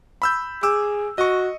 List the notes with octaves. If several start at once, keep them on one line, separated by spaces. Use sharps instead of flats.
B5 E6 G6
G#4 D6 E6
F#4 D#5 C#6